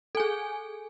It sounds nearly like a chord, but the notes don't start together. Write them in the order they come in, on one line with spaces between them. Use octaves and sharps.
A4 G#5 G#4